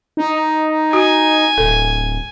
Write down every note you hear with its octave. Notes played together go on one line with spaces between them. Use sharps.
D#4
F#4 G#5
D1 A4